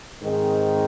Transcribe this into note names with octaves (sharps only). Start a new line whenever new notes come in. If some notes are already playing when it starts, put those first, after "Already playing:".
G#2 D#3 G#3 C4